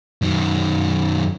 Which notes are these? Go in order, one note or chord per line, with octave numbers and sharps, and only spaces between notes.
F#2 D#3